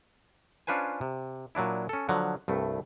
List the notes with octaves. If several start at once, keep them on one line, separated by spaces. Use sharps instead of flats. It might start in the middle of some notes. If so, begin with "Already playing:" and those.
C#4 D4 F4 B4 C5 G#5
C3
A#2 F#3 D4 E4
C#4 A4
D3 F3 F#3
C2 G2 A3